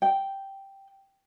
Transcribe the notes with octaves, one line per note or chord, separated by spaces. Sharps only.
G5